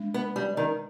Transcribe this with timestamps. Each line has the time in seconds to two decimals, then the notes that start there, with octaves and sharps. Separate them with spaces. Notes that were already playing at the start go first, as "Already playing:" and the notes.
Already playing: G#3 D4
0.14 B3
0.36 G3
0.57 D#3